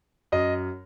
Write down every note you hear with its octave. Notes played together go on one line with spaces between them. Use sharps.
F#2 D#5